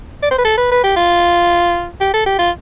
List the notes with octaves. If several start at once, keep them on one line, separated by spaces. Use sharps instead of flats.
D5
C5
B4
A4
B4
B4
G4
F4
G4
A4
G4
F4